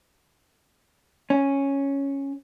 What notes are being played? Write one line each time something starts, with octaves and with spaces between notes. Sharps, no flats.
C#4